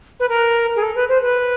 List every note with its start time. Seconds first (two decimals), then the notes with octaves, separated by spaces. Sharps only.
0.19 B4
0.28 A#4
0.76 G#4
0.82 A4
0.95 B4
1.08 C5
1.22 B4